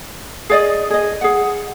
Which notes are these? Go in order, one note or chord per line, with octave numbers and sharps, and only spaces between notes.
G#4 D5 D#5
G#4 D#5
G#4 F#5